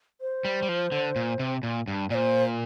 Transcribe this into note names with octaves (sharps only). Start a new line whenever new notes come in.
C5
G3
G3
F3
D3
A#2
C3
A#2
G2
A#2 C5 D5